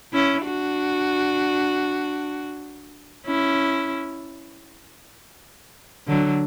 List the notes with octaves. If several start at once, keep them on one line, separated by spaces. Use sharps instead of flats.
C#4 E4
D4 F#4
C#4 E4
D3 F#3